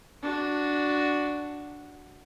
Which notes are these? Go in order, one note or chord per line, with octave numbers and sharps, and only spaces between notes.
D4 F#4